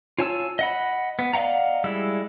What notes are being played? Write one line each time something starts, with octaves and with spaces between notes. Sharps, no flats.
F4 C#5 G#5 A5 E6
D#5 F#5 B5
B3
D5 D#5 F5 F#5 A#5
G3 G#3 E4 E6